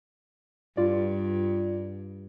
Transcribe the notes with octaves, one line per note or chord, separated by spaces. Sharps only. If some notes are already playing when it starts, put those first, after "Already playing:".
G2 F4 D5